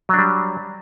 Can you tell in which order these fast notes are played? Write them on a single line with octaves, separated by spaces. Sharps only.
F#3 D4 G3